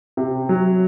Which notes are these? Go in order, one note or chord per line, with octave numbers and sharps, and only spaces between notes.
C3
F#3